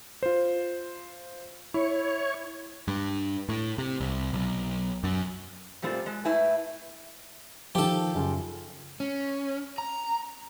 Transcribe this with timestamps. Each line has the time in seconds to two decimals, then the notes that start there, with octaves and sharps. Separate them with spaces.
0.23 F4 C5
1.74 E4 C#5
2.88 G2
3.49 A2
3.78 C3
4.00 C2
4.33 B1
5.04 F#2
5.82 A#2 G3 A3 C4 F4
6.06 G#3
6.25 A2 A3 E4 B4 G5 G#5
7.75 D#3 F3 G4 A4
8.14 F#2 C#3 F4
9.00 C#4
9.78 A#5